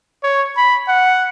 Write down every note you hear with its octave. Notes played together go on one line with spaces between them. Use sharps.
C#5
B5
F#5